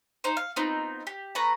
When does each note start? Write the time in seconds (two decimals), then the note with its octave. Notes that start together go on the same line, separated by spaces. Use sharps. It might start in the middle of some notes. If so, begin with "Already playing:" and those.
0.24 D#4 C5
0.37 F5
0.56 B3 C4 D#4 F4
1.07 G4
1.35 A3 B4 A#5